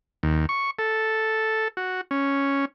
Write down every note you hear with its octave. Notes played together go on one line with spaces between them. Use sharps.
D#2
C#6
A4
F#4
C#4